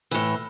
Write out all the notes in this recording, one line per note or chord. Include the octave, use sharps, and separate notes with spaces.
A2 E3